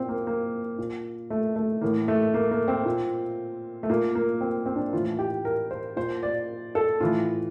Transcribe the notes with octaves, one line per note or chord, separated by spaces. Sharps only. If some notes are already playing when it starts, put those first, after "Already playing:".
Already playing: A#2 C4
A#3
A#3
A#2
A3
A3
A2 E3 A#3
A3
A#3
A#3
C4
A#2
A3
A#2 A#3
A#3
C4
C4
D4
A2 E3 F4
G4
A#4
C5
A#2 C5
D5
A4
A2 E3 F4